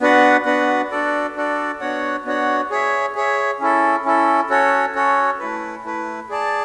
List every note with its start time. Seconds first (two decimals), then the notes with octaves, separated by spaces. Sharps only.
0.01 B3 D4 F#4 B4 F#5
0.45 B3 D4 F#4 B4 F#5
0.91 D4 F#4 A4 D5
1.35 D4 F#4 A4 D5
1.80 B3 D4 F#4 C#5 F#5
2.25 B3 D4 F#4 C#5 F#5
2.70 G#4 C#5 E5
3.15 G#4 C#5 E5
3.60 C#4 E4 A4
4.05 C#4 E4 A4
4.50 C#4 F#4 A4 C#5
4.95 C#4 F#4 A4 C#5
5.39 A3 E4 B4
5.84 A3 E4 B4
6.29 G#4 D5 A5